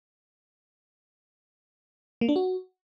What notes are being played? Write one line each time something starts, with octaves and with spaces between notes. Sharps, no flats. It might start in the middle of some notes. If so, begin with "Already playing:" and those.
A#3
D4
F#4